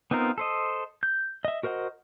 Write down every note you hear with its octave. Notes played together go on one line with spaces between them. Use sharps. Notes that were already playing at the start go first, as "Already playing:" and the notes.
B3 C4 D#4 F4 A#4
A4 C5 D#5
G6
D#5 E5
F#4 A#4 C5 D#5 F#5